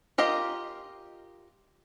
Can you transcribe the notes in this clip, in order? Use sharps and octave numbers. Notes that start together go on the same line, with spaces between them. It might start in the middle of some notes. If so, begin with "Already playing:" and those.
F4 G4 A#4 D#5